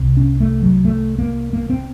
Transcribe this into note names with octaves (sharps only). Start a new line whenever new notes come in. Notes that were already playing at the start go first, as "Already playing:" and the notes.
Already playing: C2 C3
C#4
A3
F#3
A3
A#3
A#3
C4